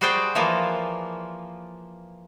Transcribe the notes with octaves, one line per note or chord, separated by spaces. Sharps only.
G3 F#4 G#4 C5 D5 G5
E3 F3 A#3 F4